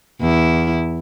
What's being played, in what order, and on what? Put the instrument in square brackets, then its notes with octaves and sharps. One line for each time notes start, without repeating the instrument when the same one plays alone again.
[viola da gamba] E2 E4